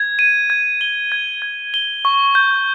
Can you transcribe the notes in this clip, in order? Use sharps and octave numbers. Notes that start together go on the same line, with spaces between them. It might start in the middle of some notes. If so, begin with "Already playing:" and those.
Already playing: G#6
D#7
G#6
G7
G#6
G#6
G7
C#6
G6